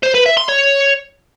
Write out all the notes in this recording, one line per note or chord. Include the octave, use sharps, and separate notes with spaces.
C5
B4
E5
C6
C#5